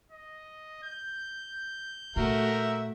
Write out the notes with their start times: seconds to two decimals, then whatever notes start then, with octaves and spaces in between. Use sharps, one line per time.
0.11 D#5
0.83 G6
2.16 A#2 A3 F#4 A#4 E5